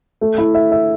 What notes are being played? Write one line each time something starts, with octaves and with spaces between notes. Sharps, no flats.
A3
E4
E5
E5